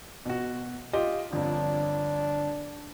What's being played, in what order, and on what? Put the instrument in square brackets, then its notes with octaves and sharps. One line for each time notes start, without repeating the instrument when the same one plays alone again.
[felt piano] B2 F#4
F4 G4 D#5
[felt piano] G1 F2 [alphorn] D4